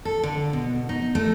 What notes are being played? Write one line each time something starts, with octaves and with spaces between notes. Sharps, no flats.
A4
D3
B2
D#4
A3